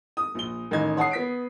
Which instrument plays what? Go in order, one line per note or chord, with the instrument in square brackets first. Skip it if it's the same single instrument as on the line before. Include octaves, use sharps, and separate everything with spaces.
[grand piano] D#6
A#1 G7
A1 D#3 D#5 G#6
C#5 F#5 A5 D#6 C7
B3 B6 D7